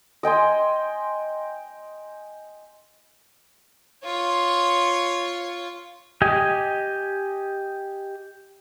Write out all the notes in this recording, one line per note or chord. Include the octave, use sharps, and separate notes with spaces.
D#5 G5 G#5 C6
F4 C#5
G4 D#5 G#5